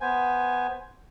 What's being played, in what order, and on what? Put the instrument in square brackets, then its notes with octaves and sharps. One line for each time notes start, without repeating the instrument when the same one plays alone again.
[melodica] B3 C5 G#5